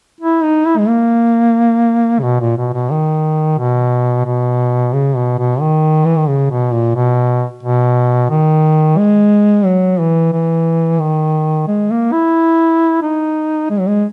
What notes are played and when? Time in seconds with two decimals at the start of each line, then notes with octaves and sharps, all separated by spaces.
0.21 E4
0.43 D#4
0.65 E4
0.78 G#3
0.88 A#3
2.19 C#3
2.23 B2
2.40 A#2
2.57 B2
2.73 B2
2.91 D#3
3.58 B2
4.25 B2
4.93 C#3
5.16 B2
5.38 B2
5.61 D#3
6.05 E3
6.17 D#3
6.28 C#3
6.51 B2
6.73 A#2
6.95 B2
7.63 B2
8.30 D#3
8.98 G#3
9.65 F#3
10.00 E3
10.33 E3
11.00 D#3
11.68 G#3
11.91 A#3
12.12 E4
13.03 D#4
13.70 G#3
13.79 F#3
13.88 G#3